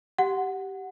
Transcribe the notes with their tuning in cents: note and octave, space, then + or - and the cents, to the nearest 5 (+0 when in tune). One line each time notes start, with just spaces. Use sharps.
G4 -15 F#5 +0